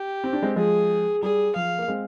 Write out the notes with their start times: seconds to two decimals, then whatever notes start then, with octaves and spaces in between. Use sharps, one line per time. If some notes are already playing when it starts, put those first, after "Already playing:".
Already playing: G4
0.24 C4
0.33 D4
0.42 G#3 C4
0.56 F3 G#3 G#4
1.22 G3 G#4
1.56 F3 F5
1.79 A#3
1.88 G#3 C4